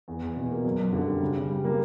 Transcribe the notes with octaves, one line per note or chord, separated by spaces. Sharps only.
E2
E2
B2
A#3
F#2
F#2
D3
G3
C#3
C#3
G3
A#3